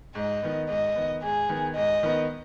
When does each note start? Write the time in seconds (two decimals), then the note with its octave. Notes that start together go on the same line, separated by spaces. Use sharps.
0.15 G#2 D#5
0.43 D#3 B3
0.69 G#2 D#5
0.96 D#3 B3
1.23 G#2 G#4
1.49 D#3 B3
1.76 G#2 D#5
2.03 D#3 B3